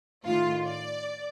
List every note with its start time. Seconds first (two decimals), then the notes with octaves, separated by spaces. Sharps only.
0.25 A2 D#3 F4
0.64 D5